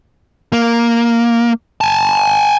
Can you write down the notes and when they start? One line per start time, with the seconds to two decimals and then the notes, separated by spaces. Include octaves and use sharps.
0.53 A#3
1.81 G#5 A5